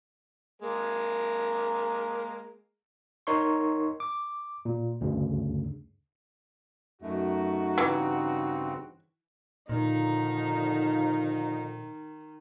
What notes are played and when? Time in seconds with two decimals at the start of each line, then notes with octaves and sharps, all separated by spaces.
0.62 G#3 A#3 A#4
3.27 D#4 A#4 C#5 C6 C#6
4.00 D6
4.65 A#2
5.01 D2 G2 C#3
7.02 F#2 A3 D#4 F#4
7.78 G2 C#3 E3 C4
9.69 A#2 D3 D#3 F3 D#4